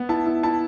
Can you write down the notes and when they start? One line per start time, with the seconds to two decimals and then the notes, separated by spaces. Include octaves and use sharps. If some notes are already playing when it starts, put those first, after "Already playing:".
Already playing: B3
0.09 E4 A5
0.26 E4
0.43 E4 A5